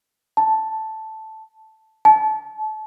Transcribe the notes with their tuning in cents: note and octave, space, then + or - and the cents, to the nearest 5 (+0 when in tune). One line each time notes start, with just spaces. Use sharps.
A5 +0
A5 -30